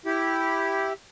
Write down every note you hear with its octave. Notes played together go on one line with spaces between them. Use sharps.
E4 G4